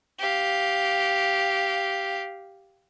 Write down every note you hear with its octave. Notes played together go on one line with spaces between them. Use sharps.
G4 F5